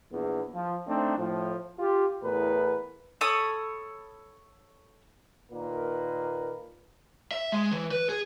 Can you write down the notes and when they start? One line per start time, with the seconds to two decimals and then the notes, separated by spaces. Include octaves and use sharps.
0.11 A#1 E2
0.54 F3
0.87 A3 C4 D4 D#4
1.18 A2 F3
1.79 F4 G4
2.22 E2 A2 A#4 B4
3.21 A4 C#5 B5 D#6
5.52 A#2 D#3 A#3 A#4 B4
7.31 E5
7.52 G#3
7.71 E3
7.91 B4
8.09 G#4